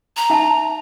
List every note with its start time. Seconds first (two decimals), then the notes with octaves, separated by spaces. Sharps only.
0.16 A#5
0.30 D#4 E5 A5